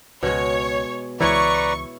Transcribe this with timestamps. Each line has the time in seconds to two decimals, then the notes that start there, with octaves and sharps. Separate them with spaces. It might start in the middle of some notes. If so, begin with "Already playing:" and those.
0.23 C#2 B2 G#3 C#5
1.20 C#2 E3 E4 B4 C#5 D5 A#5 C#6